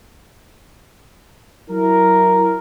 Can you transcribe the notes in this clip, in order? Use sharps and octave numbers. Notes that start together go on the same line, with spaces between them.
F#3 E4 A#4